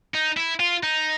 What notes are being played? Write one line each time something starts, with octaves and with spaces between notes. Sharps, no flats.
D#4
E4
F4
D#4